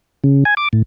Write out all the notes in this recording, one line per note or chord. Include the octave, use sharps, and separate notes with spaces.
C#3
G#5
D6
A2